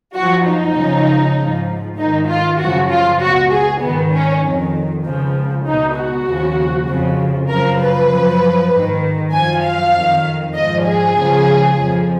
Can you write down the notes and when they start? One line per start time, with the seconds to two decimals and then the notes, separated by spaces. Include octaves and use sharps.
0.15 F#2 F3 F#4
0.46 D#4
0.76 C#2 C#3 F3
1.38 G#2 F3
1.98 G#2 D#3 D#4
2.28 F4
2.59 F#2 C#3 F3 F#4
2.89 F4
3.21 C#2 B2 F#4
3.52 G#4
3.81 G#2 D#3 B3
4.13 C#4
4.42 F2 D#3
5.04 C#2 C#3 F3
5.65 C#2 B2 D#4
5.96 F#4
6.26 D#2 C#3 F3
6.87 F2 C#3 F3
7.49 F#2 C#3 F3 A#4
7.79 B4
8.10 F#2 F3
8.71 G#2 D#3
9.32 F#2 F3 G#5
9.62 F5
9.93 F2 D#3
10.55 G#2 F3 D#5
10.85 G#4
11.15 C#2 C#3 F3
11.76 F2 F3